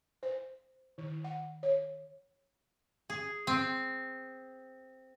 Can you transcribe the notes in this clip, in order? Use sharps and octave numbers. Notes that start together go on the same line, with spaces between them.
C5
D#3
F#5
C#5
G#4
C4